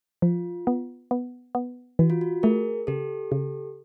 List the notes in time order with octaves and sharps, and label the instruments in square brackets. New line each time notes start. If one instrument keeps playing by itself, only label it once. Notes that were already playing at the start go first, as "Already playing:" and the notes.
[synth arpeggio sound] F3 [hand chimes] F4
[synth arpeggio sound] B3
B3
B3
[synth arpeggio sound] E3 [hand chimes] F#4
[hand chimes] F4
F#4
[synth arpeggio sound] A3 [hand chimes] G#4 A#4
[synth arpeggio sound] C#3 [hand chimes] G4 A4
[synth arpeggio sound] C#3